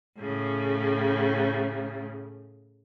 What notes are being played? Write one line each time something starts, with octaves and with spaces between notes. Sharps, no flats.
A2 C#3